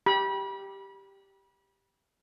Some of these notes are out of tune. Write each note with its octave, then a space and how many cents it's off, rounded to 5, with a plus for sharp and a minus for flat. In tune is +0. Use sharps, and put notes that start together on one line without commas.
G4 +0 B5 -30